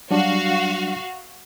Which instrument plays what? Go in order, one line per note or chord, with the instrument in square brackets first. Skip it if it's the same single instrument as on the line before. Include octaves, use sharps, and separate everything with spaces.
[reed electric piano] F#3 G3 D4 [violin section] F#4 F5